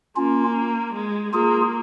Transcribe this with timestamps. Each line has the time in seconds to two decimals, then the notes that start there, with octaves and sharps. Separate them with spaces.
0.16 A#3 C#4 F4
0.94 G#3
1.33 A#3 F4 G#4